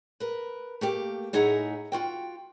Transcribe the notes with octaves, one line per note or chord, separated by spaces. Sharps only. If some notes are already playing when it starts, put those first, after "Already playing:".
A#4 B4
A3 A#3 G4
A2 D#4 G#4 E5 F#5 A#5
F4 F#4 G5